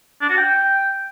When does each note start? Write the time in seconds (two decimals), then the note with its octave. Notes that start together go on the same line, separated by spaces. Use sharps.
0.22 D4
0.30 F#4
0.38 G5